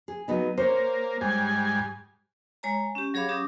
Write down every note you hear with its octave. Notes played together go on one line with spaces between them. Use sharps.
G#4
F#3 B3 D#4
A#3 C5 C#5
G#2 G3 G#5
G#3 C#5 G#5 A#5
C#4 G4
F#3 G#4 C#5 F5 B5 D6
F#3 C#4 G4 D6 D#6